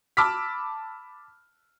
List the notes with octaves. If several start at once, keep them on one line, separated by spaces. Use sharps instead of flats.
A5 B5 D6 E6 F6 B6